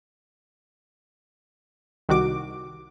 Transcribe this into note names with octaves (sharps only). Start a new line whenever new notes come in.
C2 D#3 F#4 D6